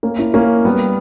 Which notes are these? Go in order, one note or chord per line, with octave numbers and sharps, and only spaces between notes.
A#3 C#4
C#4 E4
A#3 C#4
G3 B3